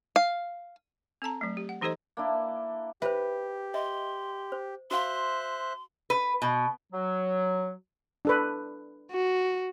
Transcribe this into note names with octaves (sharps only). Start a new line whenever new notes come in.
F5
C4 A4 A5 A#5
F#3 A3
G4
F#5
E3 D#4 G4 A4 C5 D#5
A#3 D4 E4
G4 B4 C5 E5
D#5 E5 C6
C5
F#4 C5 E5 F5 C6 F#6
B4
B2
F#3
D4 A4 B4
F#4